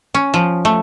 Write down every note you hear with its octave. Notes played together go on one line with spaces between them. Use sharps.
C#4
F3
A3